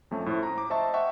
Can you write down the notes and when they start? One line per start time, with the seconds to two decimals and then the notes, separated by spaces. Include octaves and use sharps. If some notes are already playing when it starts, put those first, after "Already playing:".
0.11 F2 A3 C#4
0.26 A2 A3 C5
0.43 A#5
0.58 D6
0.70 C5 D#5 E5 A5 C#6
0.94 E5 F#5 G5 C#6